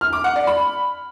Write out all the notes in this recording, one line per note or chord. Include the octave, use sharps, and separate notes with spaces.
F6
D6
F#5
D5
B5